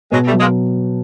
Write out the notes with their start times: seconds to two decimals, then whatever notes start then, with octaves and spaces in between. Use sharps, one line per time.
0.12 B2 F#3 G#3
0.26 G3 A3
0.33 F#3
0.39 G#3 A#3